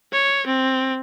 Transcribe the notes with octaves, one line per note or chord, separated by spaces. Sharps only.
C#5
C4